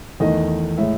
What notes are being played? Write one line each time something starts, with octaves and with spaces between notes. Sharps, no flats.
E2 D#3 A3 D#5
A2 G#3 E5